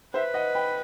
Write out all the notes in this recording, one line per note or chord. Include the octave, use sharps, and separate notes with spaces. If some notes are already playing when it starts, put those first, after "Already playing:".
B4 C5 E5
D#5 F#5
G5 B5